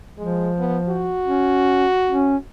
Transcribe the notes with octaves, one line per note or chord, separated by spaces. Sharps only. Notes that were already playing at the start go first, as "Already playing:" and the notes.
F3 G#3
B3
F#4
C#4
C#4